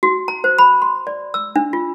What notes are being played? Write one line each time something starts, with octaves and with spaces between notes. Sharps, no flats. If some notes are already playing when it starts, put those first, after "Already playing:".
F#4
A#5
C5
B5
C6
D5
E6
D4
F4